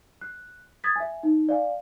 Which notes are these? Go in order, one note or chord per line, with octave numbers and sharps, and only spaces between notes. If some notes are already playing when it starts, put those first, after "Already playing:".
F#6
D#6 G#6 A6 B6
E5 G#5
D#4
D5 F5 G#5